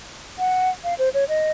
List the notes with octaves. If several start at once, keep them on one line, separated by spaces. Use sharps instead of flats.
F#5
F5
C5
C#5
D#5